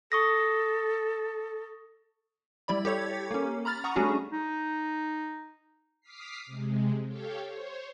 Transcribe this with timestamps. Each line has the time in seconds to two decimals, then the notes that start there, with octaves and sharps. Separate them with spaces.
0.12 A4 C#6 D#6 A#6
2.68 G3 E4 D5 B5
2.85 G4 A4 C#5 G#6
3.31 A#3 C#4
3.65 A#5 B5 F6 A6
3.84 F#5 A#5 C#6 D#6
3.96 G3 A3 C#4 D4 F#4 G#4
4.32 D#4
6.01 D6 D#6 F6 B6 C7
6.46 C3 G#3
7.07 G4 A4 C#5 F5 G5
7.44 C5 C#5